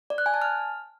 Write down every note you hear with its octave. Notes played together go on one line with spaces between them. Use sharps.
D5
F#6
G#5
A5
F6